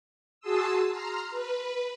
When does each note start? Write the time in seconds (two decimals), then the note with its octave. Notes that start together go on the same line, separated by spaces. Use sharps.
0.40 F#4 G#4 A5 C6 D#6 E6
0.89 A#5 C6 F6
1.30 B4